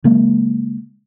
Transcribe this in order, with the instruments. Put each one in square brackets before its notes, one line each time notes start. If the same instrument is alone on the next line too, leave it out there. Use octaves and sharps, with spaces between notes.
[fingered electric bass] C#3 F#3 G#3 A#3